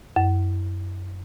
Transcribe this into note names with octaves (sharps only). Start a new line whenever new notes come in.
F#2